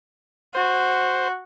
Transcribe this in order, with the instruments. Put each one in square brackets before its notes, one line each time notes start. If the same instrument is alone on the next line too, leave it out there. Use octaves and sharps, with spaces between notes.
[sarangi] F#4 [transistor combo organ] C5